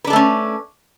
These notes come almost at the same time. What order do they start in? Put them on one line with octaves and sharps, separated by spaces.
B4 D4 A4 A3 C#4